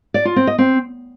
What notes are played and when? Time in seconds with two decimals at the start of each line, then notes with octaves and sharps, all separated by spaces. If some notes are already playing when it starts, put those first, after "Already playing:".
0.14 D5
0.25 F4
0.36 C4
0.47 D#5
0.58 C4